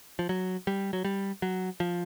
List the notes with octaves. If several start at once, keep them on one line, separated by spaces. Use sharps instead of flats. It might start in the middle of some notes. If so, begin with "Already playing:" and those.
F3
F#3
G3
F#3
G3
F#3
F3